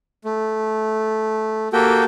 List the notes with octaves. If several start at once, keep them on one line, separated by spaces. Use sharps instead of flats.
A3
A#3 F#4 G4 A4 G5